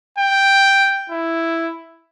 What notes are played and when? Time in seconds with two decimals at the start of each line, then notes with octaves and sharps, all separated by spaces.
0.18 G5
1.10 E4